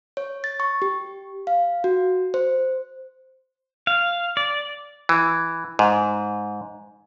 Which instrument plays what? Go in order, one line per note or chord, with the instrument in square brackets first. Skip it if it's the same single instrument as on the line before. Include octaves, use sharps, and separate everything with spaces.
[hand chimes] C#5
A6
C#6
G4
F5
F#4
C5
[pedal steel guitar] F5
D5
[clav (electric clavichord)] E3
G#2